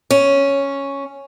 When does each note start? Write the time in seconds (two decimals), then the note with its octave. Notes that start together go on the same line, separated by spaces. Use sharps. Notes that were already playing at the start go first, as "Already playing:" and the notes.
0.11 C#4